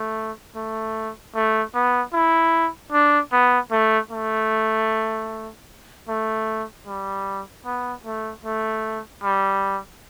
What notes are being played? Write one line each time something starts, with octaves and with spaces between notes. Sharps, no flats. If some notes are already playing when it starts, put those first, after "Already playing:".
Already playing: A3
A3
A3
B3
E4
D4
B3
A3
A3
A3
G3
B3
A3
A3
G3